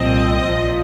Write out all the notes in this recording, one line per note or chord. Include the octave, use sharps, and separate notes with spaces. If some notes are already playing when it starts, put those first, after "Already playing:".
Already playing: C2 A#2 F3 C4 D#5
A#1 A#2 F3